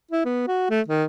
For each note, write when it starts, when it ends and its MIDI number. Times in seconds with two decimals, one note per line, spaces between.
0.11 0.24 64
0.25 0.47 59
0.47 0.66 66
0.70 0.81 57
0.88 1.04 51